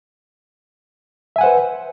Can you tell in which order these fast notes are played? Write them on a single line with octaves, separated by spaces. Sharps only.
E5 G#5 F#5 C5 B4